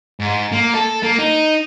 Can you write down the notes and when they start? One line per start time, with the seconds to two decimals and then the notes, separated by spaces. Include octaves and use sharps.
0.20 G#2
0.52 A#3
0.74 A4
1.03 A#3
1.19 D#4